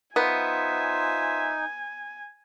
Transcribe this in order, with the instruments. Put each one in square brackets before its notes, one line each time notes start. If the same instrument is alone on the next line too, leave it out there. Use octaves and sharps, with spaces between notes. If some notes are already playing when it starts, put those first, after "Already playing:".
[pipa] B3 [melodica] D#4 [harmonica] F4 C5 E5 [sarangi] G#5